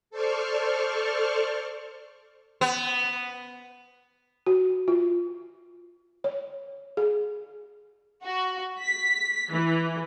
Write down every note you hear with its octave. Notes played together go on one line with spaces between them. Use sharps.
A4 C5 D5 C#6 F6
B3
F#4
F4
C#5
G#4
F#4
B6
E3